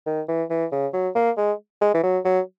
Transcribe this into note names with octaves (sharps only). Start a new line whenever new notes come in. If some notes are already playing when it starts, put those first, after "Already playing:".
D#3
E3
E3
C#3
F#3
A#3
G#3
G#3
E3
F#3
F#3